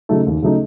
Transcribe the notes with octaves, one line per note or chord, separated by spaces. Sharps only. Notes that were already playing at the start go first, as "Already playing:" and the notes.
C#3 F#3 A3 D#4
D#2
C#3 F#3 A3 D#4